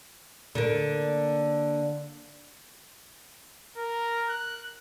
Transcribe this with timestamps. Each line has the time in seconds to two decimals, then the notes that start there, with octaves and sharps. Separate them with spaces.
0.55 D3 A#3
3.77 A#4
4.29 F#6